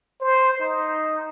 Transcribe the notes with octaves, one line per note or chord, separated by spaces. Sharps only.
C5
D#4